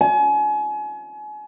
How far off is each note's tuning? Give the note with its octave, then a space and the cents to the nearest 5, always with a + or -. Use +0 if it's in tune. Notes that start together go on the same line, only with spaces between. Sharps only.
G#5 +35